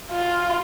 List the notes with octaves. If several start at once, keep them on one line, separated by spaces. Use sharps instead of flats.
F4